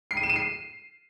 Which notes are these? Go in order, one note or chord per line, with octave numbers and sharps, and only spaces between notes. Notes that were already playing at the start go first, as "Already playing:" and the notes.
C7
D#7
E7
D#7
C7